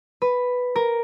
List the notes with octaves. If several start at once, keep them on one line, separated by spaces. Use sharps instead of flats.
B4
A#4